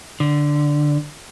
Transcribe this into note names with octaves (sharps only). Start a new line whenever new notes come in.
D3